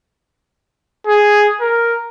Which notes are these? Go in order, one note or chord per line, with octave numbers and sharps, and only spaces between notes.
G#4
A#4